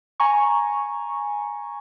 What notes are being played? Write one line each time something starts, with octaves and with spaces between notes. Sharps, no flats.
G#5 A#5 C#6